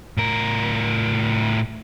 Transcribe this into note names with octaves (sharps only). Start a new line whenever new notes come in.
A2 A#4